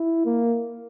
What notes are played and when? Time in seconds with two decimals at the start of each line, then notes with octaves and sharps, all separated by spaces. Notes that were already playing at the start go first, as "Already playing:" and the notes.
Already playing: E4
0.25 A#3